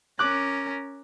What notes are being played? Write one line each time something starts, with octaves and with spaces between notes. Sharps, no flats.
C#4 A#4 D6 F#6